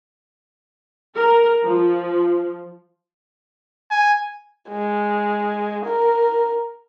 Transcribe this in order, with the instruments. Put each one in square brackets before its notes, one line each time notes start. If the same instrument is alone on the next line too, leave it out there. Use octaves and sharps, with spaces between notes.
[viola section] A#4
F3
[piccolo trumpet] G#5
[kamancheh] G#3
A#4